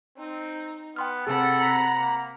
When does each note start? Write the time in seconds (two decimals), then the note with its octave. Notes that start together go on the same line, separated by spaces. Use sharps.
0.18 C4 D#4
0.96 B3 G5 C6 F6
1.27 C3 G#4 A4 F#5 B5
1.61 A#5 B6
1.98 A#3